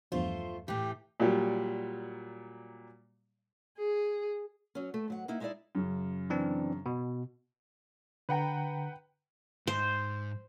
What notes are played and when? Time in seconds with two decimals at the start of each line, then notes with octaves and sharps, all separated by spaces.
0.12 E2 G2 F3 A3 F4 C5
0.68 A2 E3 G4
1.20 A#2 F#3 G3
3.78 G#4
4.75 F#3 C#4
4.94 A3
5.08 G#2 F#3 F#5
5.28 A#3 D#4 E4
5.40 G#3 D#4 E4 C5 D5 E5
5.75 F#2 C#3
6.30 E3 C4 D4
6.86 B2
8.29 D3 B4 F#5 G5 A#5
9.67 G#2 C5